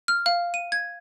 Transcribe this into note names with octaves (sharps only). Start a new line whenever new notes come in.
F6
F5
D#7
G#6